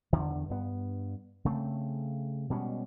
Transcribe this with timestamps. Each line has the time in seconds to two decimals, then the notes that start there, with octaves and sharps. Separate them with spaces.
0.13 E2 D3 D#3
0.50 G2 B3
1.45 C#3 A3 C4
2.50 B2 G3 G#3 C#4